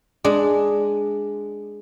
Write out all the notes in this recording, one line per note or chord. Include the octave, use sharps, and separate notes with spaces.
G#3 D4